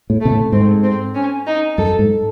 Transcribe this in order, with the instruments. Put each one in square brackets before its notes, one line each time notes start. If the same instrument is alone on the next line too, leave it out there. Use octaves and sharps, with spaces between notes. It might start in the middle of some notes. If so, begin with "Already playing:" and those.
[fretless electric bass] A2
[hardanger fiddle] A3
[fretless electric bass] C3
A2
[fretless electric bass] G#2 [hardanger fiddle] C4
[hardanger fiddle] C4
C#4
D#4
[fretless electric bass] F#2 [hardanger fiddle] A4
[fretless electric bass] G#2